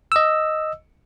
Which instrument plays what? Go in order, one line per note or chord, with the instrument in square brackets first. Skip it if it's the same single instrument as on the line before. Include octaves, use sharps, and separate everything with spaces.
[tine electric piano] D#5 E6